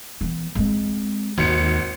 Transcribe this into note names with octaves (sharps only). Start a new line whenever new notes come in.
E3 B3
G#3 C4
G#1 D#2 C#7